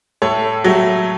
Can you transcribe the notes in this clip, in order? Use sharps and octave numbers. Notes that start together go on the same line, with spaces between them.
A2 A4 C#5
F#3 A3